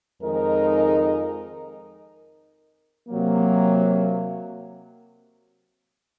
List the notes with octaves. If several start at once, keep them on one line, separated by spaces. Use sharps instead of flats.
F2 D#3 G#3 D#4 A#4
C3 F#3 A#3